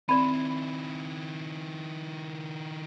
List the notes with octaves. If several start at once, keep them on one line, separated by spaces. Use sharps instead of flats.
D#3 C4 E4 D5 B5